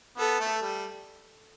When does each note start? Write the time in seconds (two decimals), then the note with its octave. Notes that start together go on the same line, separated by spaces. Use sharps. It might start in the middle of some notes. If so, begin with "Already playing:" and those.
0.17 B3 A4
0.40 A3
0.62 G3